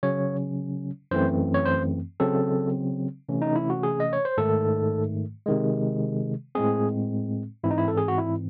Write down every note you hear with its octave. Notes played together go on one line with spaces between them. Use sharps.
C#3 F#3 C#4 C#5
F#2 E3 A3 C4 C5
C#5
C5
C#3 F#3 C4 A4
C3 E3 A3 C#4
D#4
E4
F#4
G#4
D#5
C#5
C5
G#2 D#3 A3 A4
C3 D#3 G#3
A2 G#3 C4 G#4
G#2 E3 C4 E4
D#4
E4
A4
G#4
F#4
E4